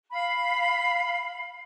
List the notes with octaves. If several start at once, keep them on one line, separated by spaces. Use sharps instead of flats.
F5 B5